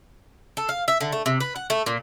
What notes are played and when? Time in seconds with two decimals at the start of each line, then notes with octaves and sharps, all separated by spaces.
0.57 A4
0.69 F5
0.88 E5
1.01 D3
1.12 A3
1.26 C3
1.40 B4
1.56 F#5
1.70 A3
1.86 A#2